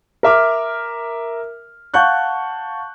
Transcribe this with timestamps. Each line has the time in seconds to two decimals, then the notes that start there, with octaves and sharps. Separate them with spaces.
0.23 A#4 E5 D6 F6
1.94 F5 F#5 A5 C#6 F#6 G6